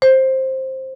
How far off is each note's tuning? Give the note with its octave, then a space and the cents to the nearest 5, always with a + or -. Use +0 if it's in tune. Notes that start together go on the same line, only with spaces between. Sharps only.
C5 +10